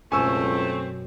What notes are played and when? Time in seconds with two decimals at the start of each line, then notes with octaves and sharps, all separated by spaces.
0.12 C#2 F#2 B2 A3 C4 G#5 C#6 E6